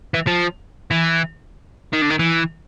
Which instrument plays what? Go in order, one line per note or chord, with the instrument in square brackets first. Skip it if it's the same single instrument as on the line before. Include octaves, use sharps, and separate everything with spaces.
[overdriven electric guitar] E3
F3
E3
D#3
D3
D#3
E3